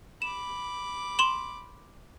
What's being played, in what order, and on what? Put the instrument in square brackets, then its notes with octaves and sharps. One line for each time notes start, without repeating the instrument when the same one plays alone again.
[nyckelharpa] B5 D6 [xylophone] E7
[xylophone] C6 E7 F#7